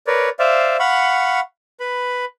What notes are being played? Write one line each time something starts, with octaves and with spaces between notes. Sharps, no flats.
A#4 B4 C#5 D5
C5 D5 E5 F5
F5 F#5 B5 C#6
B4 B5